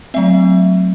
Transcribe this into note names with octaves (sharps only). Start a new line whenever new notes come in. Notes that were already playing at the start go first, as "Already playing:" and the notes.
F#3 A3 C4 E5